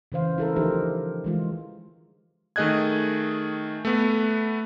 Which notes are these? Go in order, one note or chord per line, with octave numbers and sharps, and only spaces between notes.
C#3 E3 C5 F5
E4 A4 A#4
D3 F3 D#4 G4 A#4 C5
E3 G#3 F4
D#3 A3 G#4 D#5 F#6 G#6
A3 B3